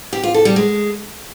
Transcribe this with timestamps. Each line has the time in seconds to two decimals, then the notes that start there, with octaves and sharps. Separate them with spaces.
0.13 G4
0.24 F4
0.34 A4
0.45 G3
0.56 G#3